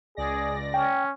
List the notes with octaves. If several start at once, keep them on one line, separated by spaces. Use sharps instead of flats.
C#2 G#4 D5 A#6
C#4 G5